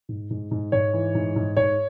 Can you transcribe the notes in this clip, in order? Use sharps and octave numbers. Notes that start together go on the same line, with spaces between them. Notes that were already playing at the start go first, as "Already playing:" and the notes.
G#2
G#2
G#2
G#2 C#5
E3
G#2
G#2
G#2 C#5